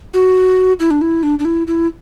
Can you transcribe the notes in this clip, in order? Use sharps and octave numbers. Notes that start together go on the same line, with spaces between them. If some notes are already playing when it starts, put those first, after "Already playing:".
F#4
E4
D4
E4
D4
D4
E4
E4